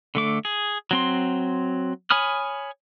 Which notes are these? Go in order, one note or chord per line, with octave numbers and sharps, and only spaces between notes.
D3 A3 D6
G#4
F#3 C4 C6
C#5 G#5 B5 D#6 F6